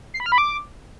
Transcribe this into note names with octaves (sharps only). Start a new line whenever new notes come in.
C7
B5
F6
B5
D6